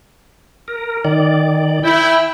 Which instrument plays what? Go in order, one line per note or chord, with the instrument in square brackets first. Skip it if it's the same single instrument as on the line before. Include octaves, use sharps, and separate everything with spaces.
[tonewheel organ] A#4
D#3 D5
[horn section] E4 [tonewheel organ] G5